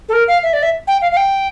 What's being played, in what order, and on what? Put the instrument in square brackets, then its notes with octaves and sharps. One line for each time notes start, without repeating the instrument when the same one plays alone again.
[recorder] A4
A#4
F5
E5
D5
E5
G5
F5
F5
G5